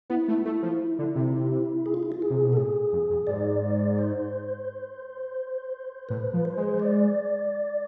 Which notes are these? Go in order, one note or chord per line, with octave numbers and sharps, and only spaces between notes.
B3 E4
A3
A3 E4
F3
D3
C3
G#4
F4
E4
F4
G#4
C3
B2
A4
A2 G#4
F2
F2
G#2 D5
C5
A2 B4
F3
C5
G#3
D5